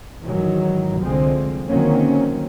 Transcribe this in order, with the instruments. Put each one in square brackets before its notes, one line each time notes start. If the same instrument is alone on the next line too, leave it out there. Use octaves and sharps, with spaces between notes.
[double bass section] G#2 D#3 E3 F#3
C2 D3 F3 G#3 C4
D3 D#3 F#3 A#3 C4 C#4